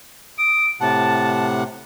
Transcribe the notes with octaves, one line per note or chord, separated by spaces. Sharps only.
D#6 D7
A2 C3 F#5 A5